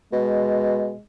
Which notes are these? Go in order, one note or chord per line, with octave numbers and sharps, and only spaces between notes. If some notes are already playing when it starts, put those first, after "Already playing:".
B2 G#3